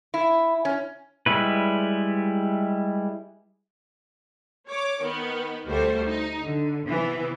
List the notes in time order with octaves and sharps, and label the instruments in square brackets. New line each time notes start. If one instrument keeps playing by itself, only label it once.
[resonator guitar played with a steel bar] E4
C#4
[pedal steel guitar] G3 G#3 E4 B4
[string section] C#5 D6
D#3 B3
D2 G3 A3 F#4 C5
D#4
D3
C3 E3 B3